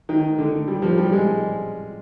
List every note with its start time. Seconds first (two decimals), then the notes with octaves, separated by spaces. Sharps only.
0.09 D#3
0.38 D3
0.68 G3
0.82 F3
0.98 G3
1.12 G#3